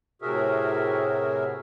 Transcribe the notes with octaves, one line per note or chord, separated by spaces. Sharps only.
A2 C3 F#4 G#4 A#4 E5